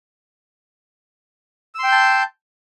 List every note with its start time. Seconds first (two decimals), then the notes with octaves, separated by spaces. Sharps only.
1.75 E6
1.79 C6
1.83 G5
1.88 G6
1.92 A5